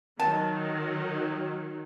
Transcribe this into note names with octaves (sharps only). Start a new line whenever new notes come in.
D#3 F#3 A5